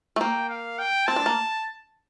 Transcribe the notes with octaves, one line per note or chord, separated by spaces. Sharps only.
A3
A#3 G5
F5
G5
C4 A5
D4
A#3